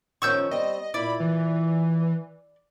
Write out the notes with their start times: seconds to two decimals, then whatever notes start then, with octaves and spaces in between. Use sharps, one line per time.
0.22 D#3 F3 C#4 C#6 E6 G6
0.51 G3 C4 D#5
0.94 A#2 E4 D5 B5
1.20 E3